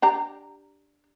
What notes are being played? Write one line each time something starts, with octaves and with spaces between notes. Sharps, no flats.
D4 G4 A#5